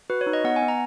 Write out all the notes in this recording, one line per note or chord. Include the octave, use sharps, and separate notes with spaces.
F#4 B4
C#5
D#4
D#5
B3 F#5
G#5
B3
A#5